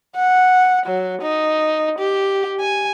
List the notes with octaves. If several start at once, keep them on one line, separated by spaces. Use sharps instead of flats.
F#5
F#3
D#4
G4
G#5